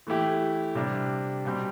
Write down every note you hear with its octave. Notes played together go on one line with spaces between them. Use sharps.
E3 A3 E4 G4
C3 G3 D4
B2 G3 C4 G4